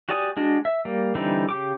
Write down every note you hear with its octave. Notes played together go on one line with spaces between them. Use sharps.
F#4 G4 D5 G#5 D#6
G#3 D4 F#4
E5
G3 A#3
D3 E3 G3 C4 D#4
C#3 G4 D6